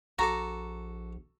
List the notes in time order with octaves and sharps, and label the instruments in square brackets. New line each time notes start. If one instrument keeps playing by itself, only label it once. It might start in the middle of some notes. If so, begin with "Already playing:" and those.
[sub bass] A#1 [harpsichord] F#4 A4 D6 [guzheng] A#5